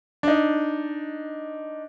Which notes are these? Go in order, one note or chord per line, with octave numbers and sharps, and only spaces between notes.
D4 D#4